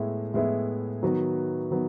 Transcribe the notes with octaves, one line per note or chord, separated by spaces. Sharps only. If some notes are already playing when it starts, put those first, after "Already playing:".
Already playing: A2 G#3 B3 E4
A2 G#3 B3 E4
D#3 F#3 B3 F#4 B4
D#3 F#3 B3